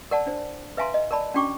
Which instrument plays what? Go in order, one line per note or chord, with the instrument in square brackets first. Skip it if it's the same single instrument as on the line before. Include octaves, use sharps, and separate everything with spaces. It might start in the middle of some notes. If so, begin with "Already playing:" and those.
[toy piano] A#4 D5 F#5 A5
D4 C5
B4 E5 F5 G#5 A#5 C6
D#5
A#4 D5 A5 B5
C#4 D4 F#4 G5 C#6 D6